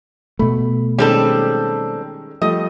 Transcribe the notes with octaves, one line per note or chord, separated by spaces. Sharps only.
B2 A3 B5
D#3 G3 G#3 C4 C#4 A4
F3 G3 A3 D#5